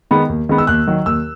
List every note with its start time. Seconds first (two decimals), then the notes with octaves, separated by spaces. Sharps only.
0.11 D#3 G#3 B3
0.29 D#2
0.49 D#3 G#3 B3
0.58 E6
0.67 D#2 F#6
0.87 D#3 F#3
1.06 D#2 E6